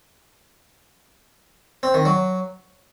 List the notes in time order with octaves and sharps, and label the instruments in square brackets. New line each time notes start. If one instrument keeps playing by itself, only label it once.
[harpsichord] C4
D#3
F#3